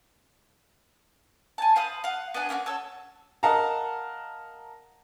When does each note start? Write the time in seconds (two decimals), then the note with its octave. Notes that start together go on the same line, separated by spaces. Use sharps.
1.58 G#5 A5
1.76 C5 F5 B5 D#6
2.04 F5 F#5
2.34 B3 D4 F#5 G#5
2.49 A#3 C#4 E4 F#4
2.66 A4 C#5 E6
3.43 A#4 D#5 F5 F#5 A5 A#5